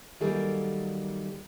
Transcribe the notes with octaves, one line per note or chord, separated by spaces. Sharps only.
D#3 F#3 G3 A#3 G#4 A4